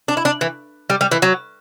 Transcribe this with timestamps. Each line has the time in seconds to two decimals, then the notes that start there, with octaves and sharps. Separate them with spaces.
0.08 D4
0.17 E4
0.25 D4
0.41 E3
0.90 G3
1.01 G3
1.11 E3
1.22 F#3